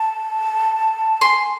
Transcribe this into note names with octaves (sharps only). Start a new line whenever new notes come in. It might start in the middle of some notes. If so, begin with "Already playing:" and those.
Already playing: A5
G#5 C6